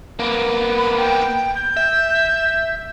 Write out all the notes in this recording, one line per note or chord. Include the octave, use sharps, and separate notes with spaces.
A#3 B3
B5
G5
G6
E5